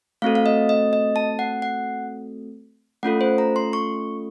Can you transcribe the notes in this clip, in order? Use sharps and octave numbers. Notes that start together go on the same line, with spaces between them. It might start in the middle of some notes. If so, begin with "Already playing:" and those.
A3 C4 F#4 A4 F5
F5
D#5
D#5
D#5
A5
F#5
F#5
A3 C#4 F4 A4 F#5
C5
A#5
C6
C#6